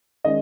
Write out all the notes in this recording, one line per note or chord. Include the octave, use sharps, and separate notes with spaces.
D#3 G#3 C#4 D#5